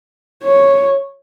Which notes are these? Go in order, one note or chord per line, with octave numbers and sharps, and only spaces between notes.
C#5